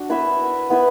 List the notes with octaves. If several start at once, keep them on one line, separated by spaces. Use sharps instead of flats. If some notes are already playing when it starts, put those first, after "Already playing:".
Already playing: D4 F#4
B3 E4 B4 E5
B3 E4 B4 E5